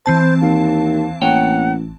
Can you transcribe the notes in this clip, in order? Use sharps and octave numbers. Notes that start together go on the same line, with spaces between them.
E3 C4 C5 A5
D#2 F5
A1 A#3 C#5 F#5 G5